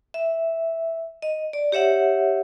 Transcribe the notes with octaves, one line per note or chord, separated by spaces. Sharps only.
E5
D#5
D5
G4 C#5 E5 F#5